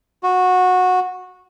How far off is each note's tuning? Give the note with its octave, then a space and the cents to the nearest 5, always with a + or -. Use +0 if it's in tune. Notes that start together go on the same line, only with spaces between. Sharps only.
F#4 -15